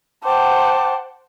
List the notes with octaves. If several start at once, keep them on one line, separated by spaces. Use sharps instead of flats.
C5 F#5 G5 A5 D6